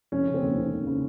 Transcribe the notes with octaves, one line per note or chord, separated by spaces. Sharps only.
F1 C#4
C#3
C4
D#2
F1
F1
C#3